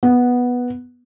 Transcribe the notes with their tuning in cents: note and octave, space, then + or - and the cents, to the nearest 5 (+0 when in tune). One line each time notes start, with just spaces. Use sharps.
B3 -5